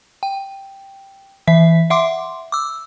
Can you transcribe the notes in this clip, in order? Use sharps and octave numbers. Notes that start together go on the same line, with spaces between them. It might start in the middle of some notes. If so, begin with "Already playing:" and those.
G5
E3 E5 B6
E5 F#5 C6 D6
D6 E6